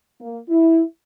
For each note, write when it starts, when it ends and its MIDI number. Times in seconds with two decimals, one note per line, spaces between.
0.20 0.38 58
0.49 0.82 64